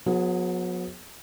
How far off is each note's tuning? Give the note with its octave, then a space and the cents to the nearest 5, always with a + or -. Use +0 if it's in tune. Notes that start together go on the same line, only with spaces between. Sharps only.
F#3 -35 B3 +0 G#4 +0